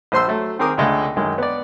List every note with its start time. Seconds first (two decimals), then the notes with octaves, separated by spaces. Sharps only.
0.12 A#1 C5 C6 E6
0.27 F#3 A3
0.59 D#3 C4 G#4 A#4 D6 D#6
0.78 C#2 D3 G#3 A3
1.16 F#2 D#3 G#3
1.38 B3 D5